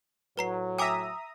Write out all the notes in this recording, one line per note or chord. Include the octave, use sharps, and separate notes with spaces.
A2 F#3 B4 A#5 C7
E5 G5 G#5 A#5 D6 D#6